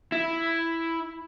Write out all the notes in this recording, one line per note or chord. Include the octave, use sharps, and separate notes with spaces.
E4